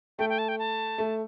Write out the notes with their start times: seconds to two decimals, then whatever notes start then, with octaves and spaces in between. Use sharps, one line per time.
0.19 A3 G5
0.29 G5
0.38 A5
0.48 G5
0.59 A5
0.98 A3